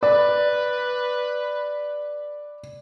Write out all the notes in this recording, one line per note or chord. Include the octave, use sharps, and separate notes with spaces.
B4 D5